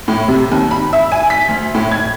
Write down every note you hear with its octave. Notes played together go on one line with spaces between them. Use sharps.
A2
C3
D#2
B5
E5
G#5
B6
D2
A2
G#6